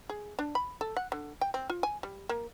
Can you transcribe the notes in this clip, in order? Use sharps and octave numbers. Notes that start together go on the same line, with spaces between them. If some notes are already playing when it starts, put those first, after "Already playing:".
G#4
D4
B5
A4
F#5
D3
G5
C4
F4
G#5
G3
A#3